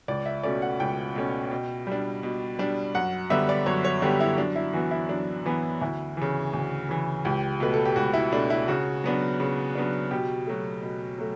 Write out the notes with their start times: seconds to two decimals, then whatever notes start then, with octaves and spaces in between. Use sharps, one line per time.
0.08 C#2 D5
0.26 E5
0.44 B2 A3 C#4 D5
0.62 F#5
0.80 C#2 G5
1.15 B2 A3 C#4
1.51 B2
1.87 G3 D4
2.23 B2
2.59 G3 D4
2.95 F#2 F#5
3.30 D3 G3 B3 E5
3.49 D5
3.66 F#2 C#5
3.84 C#5
4.02 D3 G3 B3 G4
4.20 E4
4.38 F#2 D4
4.56 E4
4.73 E3 B3 F#4
4.91 E4
5.09 F#2 D4
5.46 E3 B3
5.81 D2 E4
6.17 C#3 E3
6.54 D2
6.89 C#3 E3
7.25 C#2 G4
7.60 B2 A3 B4
7.74 A4
7.85 G4
7.96 C#2 F#4
8.14 E4
8.32 B2 A3 D4
8.50 E4
8.68 C#3 F#4
9.04 F#3 B3 D4
9.40 C#3
9.75 F#3 B3 D4
10.11 B2 G4
10.47 F#3 A3
10.82 B2
11.19 F#3 A3